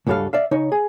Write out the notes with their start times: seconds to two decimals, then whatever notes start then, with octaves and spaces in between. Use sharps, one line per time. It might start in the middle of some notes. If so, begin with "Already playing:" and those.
0.07 C#2 G2 F#3 G3 A4 F5
0.33 D5 E5 F5
0.51 C#3 D#4 C#5
0.72 G#4